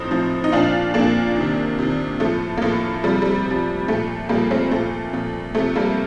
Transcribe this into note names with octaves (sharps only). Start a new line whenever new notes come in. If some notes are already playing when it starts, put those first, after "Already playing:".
Already playing: A2 F3 C4 D#4
A2 F3
D#4
A#2 F3 D4 F4
A#2 F3 A#3 D4
C3 D#3
C3 D#3
A2 F3 A3
A#3
A2 F3 A3
C3 F3 G3
G3
C3
F3
A#2 F3 A3
A#2 F3 G3 A#3
A3 C4
A#2 F3 A3
A#2 F3
C3 F3 A3
G3 A#3